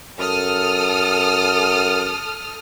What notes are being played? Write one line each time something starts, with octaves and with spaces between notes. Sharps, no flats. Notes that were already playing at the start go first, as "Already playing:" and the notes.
F#2 A4 D#6 F6